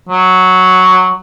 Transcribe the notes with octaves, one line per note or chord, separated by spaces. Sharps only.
F#3